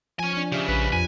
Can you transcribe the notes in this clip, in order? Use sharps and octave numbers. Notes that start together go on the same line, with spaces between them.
F3 C#4 G#5
F3 D4
C#3 G4 D5 E5
A#1 B4
F2 F3 G#5